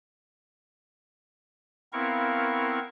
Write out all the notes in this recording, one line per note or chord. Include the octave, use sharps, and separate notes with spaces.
B3 C4 E4 A#4 F5 C#6